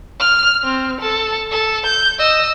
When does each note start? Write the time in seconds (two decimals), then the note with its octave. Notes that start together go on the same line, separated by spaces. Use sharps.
0.20 F6
0.63 C4
1.01 A4
1.51 A4
1.86 G6
2.19 D#5 E6